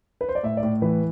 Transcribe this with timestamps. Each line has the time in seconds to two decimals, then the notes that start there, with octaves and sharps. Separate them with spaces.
0.21 B4
0.29 C5
0.35 D5
0.43 A2 E5
0.57 D5
0.63 A2
0.82 E3 B4